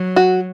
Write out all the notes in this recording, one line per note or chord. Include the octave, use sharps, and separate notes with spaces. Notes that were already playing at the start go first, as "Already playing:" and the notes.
Already playing: F#3
F#4